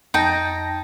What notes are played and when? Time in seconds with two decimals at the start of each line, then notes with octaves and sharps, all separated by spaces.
0.14 F2 D#4 G5 A5 A#6